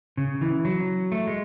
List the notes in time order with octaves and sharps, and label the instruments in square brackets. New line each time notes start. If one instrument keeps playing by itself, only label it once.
[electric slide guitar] C#3
E3
F#3
A3
G#3